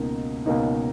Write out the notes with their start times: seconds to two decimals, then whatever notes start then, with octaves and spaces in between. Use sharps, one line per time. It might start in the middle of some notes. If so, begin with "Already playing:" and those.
Already playing: C#2 B2 A#3 D#4
0.46 C#2 B2 A#3 D#4